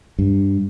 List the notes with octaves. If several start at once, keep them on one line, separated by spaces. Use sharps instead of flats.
G2